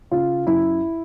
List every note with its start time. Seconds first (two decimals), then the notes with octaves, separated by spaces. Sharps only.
0.11 C#3 F4
0.47 F#2 E4